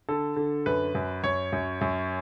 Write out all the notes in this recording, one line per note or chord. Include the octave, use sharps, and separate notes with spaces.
D3 A4
D3
F#2 B4
F#2
F#2 C#5
F#2
F#2